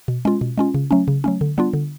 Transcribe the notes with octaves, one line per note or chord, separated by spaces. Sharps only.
B2
G#3 C#4 F4
B2
G#3 C#4 F4
C#3
F#3 A3 C#4
C#3
F#3 A3 C#4
D3
G3 B3 D4 F4
D3